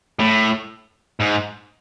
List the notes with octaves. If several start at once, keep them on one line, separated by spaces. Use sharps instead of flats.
A2
G#2